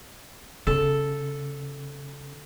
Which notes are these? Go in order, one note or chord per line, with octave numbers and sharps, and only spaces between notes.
C#3 A4